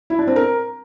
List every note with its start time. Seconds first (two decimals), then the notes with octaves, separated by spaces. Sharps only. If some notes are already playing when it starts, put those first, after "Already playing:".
0.10 E4
0.19 D4
0.27 C4
0.36 A#4